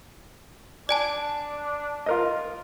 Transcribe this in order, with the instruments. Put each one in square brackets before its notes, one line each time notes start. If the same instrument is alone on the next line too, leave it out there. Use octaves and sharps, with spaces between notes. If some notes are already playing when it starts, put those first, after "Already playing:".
[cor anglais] D4 [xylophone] D5 G#5 A5
[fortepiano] F4 A#4 D#5